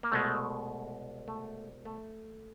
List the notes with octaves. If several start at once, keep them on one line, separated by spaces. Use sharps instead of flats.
A#3
C2 B2 G#3 A3
A3
A3